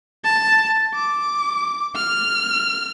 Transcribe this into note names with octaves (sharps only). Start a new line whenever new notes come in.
A5
D6
F6